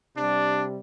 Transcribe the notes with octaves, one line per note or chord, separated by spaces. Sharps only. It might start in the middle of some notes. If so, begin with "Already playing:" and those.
C3 G3 D4